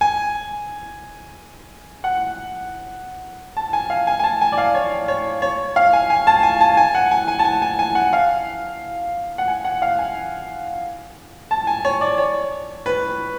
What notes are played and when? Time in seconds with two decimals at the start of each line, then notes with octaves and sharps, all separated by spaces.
0.01 G#5
2.04 F#5
3.57 A5
3.73 G#5
3.90 F5
4.07 G#5
4.20 G#5
4.24 A5
4.41 G#5
4.52 D5
4.58 F5
4.74 C#5
5.08 C#5
5.42 C#5
5.76 F5
5.93 G#5
6.10 G#5
6.27 A5
6.43 G#5
6.61 A5
6.77 G#5
6.95 F#5
7.11 G#5
7.28 G#5
7.39 A5
7.45 G#5
7.62 G#5
7.79 G#5
7.95 F#5
8.13 F5
9.38 F#5
9.48 G#5
9.65 F#5
9.82 F5
9.99 G#5
11.51 A5
11.67 G#5
11.85 C#5
12.01 D5
12.18 C#5
12.86 B4